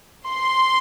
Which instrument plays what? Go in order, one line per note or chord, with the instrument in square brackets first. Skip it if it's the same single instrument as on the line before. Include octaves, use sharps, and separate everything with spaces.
[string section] C6